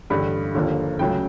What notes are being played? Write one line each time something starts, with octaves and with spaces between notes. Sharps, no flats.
A1 G2 D3 B5
D#2 D3 F3 A#3
C#2 C#3 F#3 A3 G5